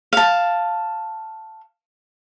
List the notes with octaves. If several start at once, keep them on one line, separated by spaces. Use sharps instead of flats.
F5 A5